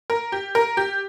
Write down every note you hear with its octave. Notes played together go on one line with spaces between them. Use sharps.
A#4
G4
A#4
G4